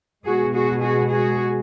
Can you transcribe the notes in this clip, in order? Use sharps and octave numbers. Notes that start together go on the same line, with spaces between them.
B2 G#3 F#4 G#4
F#4 G#4
F#4 G#4
F#4 G#4